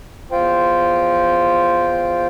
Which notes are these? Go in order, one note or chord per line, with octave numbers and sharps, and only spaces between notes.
E2 F4 C5 G5